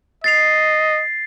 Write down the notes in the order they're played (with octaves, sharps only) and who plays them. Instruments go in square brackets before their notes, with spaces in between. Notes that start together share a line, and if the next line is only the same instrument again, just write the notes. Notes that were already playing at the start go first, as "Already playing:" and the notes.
[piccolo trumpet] D#5 [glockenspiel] A6 C7 F7